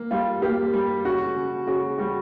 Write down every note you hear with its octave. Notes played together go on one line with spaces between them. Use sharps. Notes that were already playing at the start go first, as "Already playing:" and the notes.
Already playing: A#3
G3 F4
A#3 G4
G3
C#3 F#4
C#3
C#3 F#4
G3 F#4